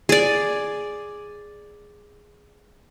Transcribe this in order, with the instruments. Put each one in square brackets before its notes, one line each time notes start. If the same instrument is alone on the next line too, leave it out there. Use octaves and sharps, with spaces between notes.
[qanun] G#4 D5